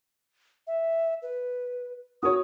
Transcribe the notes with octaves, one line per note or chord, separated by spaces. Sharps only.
E5
B4
F#4 A#4 C#5 D#6